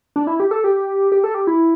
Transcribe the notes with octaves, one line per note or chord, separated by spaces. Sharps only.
D4
E4
G4
A4
G4
G4
A4
G4
E4